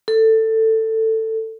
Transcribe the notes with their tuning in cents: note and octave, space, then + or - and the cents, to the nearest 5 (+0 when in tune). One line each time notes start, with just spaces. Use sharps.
A4 +15